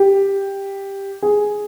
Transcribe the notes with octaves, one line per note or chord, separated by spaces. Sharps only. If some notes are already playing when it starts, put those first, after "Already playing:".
Already playing: G4
G#4